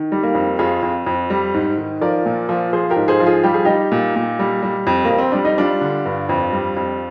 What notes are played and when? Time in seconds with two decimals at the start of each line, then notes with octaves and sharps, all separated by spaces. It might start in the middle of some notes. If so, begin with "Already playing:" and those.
Already playing: D#3
0.12 G3
0.23 A#3
0.35 F2
0.59 F2 F4 G#4
0.83 F2
1.06 F2
1.30 G3
1.54 G#2
1.78 D#3
2.01 F3 A#4 D5
2.26 A#2
2.49 F3
2.73 F3 G#4 C5
2.91 G4 A#4
2.96 G#2
3.08 G#4 C5
3.20 F3
3.26 F4 G#4
3.44 G3 G4
3.54 G#4
3.65 G3 D#4 G4
3.92 A#2
4.16 A#2
4.39 G3
4.63 G3
4.87 F2
5.05 A#3
5.10 F2
5.18 C4
5.32 G3 D4
5.45 D#4
5.58 G3 D4 F4
5.81 D3
6.06 G2
6.29 F2
6.53 G3
6.77 F2